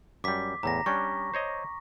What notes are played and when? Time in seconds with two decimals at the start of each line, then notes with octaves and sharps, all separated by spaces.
0.24 F#2 G3 D6 B6
0.63 E2 A2 A#5 A#6
0.86 G3 C#4 D4 C#6
1.34 C5 C#5 D#5